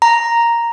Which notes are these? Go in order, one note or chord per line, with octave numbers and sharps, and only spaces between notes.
A#5